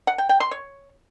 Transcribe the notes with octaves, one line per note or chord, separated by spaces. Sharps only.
F#5
G5
G5
C6
C#5